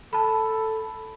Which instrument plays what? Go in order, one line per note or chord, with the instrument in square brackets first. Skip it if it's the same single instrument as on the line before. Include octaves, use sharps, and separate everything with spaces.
[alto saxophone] A4 [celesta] A5 B5